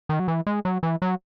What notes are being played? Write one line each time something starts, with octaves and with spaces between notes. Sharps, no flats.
D#3
F#3
E3
G#3
F#3
E3
F#3